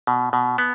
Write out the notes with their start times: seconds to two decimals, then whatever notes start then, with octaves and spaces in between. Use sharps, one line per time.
0.07 B2
0.33 B2
0.58 B3